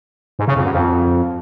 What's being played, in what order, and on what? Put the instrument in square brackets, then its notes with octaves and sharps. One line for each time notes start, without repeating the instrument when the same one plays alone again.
[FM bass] G#2
C#3
F2
F#2
F2